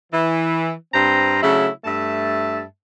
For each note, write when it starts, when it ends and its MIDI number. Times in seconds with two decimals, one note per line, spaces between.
0.12 0.71 52
0.93 1.38 43
0.93 1.38 60
0.93 1.38 72
0.93 1.38 79
0.93 1.38 82
1.42 1.68 49
1.42 1.68 54
1.42 1.68 57
1.42 1.68 62
1.42 1.68 64
1.84 2.62 43
1.84 2.62 57
1.84 2.62 76
1.84 2.62 81